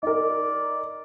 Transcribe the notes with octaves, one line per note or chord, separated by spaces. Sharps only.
D#4 A#4 D5